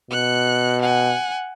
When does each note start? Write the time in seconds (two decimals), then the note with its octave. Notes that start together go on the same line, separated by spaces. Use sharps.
0.11 B2 F#6 C#7
0.81 F#5 G#5